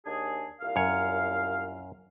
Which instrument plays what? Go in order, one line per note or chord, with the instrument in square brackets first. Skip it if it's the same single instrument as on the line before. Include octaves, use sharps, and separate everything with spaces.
[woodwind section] D#2 D4 G#4
C2 A#2 F5
[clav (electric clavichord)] F#2 C#5